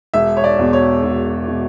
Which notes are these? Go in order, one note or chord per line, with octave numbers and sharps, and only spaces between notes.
E1 E5
C#5
D5
E2 B2
C#5
E1
B2